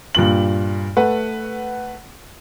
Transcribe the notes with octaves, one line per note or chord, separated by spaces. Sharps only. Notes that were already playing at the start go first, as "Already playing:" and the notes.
G2 A#2 F#7
A3 B4 F#5